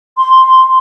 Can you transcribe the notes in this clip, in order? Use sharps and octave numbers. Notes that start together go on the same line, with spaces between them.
C6
C6